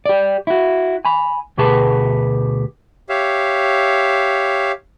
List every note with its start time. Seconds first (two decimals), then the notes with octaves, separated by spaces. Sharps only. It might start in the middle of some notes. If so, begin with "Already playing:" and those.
0.06 G4 D5
0.47 E4 F#4
1.05 G#5 B5
1.58 D2 B2 G4 G#4 B4 A5
3.09 G4 C#5 E5 F5